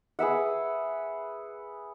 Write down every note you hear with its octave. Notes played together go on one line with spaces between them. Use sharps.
G#4 B4 E5 F#5